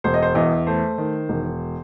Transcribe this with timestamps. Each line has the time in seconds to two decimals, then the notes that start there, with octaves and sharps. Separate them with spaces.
0.04 E1 C5
0.14 D#5
0.23 C5
0.35 E2 D#5
0.67 A3 C5
0.98 D#3
1.29 E1